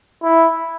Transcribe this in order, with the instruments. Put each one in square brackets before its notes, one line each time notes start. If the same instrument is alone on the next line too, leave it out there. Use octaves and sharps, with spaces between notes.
[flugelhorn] E4